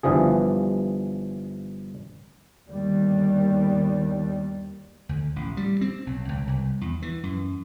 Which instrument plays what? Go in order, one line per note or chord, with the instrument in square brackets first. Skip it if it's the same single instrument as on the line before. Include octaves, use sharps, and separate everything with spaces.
[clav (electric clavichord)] G1 G2 E3 F3 G#4
[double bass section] G1 D#2 G3
[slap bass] D2
A1
G3
C4
B1
C#2
C2
E2
E3
F#2